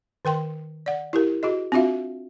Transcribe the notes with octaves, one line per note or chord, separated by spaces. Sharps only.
D#3 A#4 G5 C6
D5 F#5
E4 G4 A#4
F#4 G#4 D#5
C4 D4 F4 F#4 E5 F5